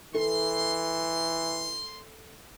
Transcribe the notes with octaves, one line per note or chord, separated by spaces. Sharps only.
E3 A4 C6